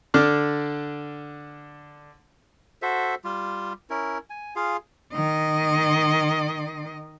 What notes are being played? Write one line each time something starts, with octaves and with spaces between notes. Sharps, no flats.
D3 D4 D6 F6
F#4 A4 C5 E5
G3 F4
C#4 E4 A#4
G#5
F4 G#4 F5
D#3 D#5